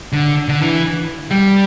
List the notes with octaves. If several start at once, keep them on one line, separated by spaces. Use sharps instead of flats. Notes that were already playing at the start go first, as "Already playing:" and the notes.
D3
D3
E3
G3